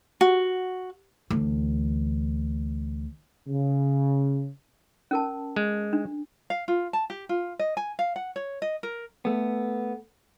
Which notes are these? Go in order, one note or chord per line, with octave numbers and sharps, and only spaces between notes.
F#4
D2 E3
C#3
C#4 A#4 A5
G#3
D4
F5
F4
A5
G4
F4
D#5
G#5
F5
F#5
C#5
D#5
A#4
A3 B3